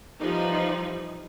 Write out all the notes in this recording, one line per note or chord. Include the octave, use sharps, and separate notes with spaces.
E3 F3 G3 D#4